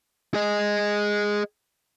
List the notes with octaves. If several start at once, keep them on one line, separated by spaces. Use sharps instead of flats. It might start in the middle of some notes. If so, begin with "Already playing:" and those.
G#4 D#5